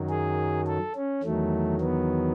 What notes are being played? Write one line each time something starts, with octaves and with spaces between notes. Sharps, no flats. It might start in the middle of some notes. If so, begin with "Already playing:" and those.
Already playing: F#2 D#3 F#3
G#4
A4
C#4
E2 D#3 F#3 A3
B3